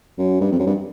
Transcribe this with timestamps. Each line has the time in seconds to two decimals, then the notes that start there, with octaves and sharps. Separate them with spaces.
0.18 F#2
0.41 G2
0.52 F2
0.59 F#2
0.66 G2